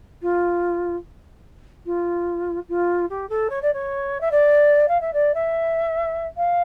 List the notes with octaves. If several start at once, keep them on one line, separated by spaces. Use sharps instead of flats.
F4
F4
F4
G4
A4
C#5
D5
C#5
E5
D5
F5
E5
D5
E5
F5